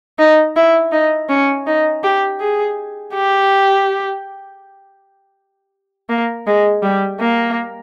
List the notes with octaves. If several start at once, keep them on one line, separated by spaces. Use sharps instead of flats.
D#4
E4
D#4
C#4
D#4
G4
G#4
G4
A#3
G#3
G3
A#3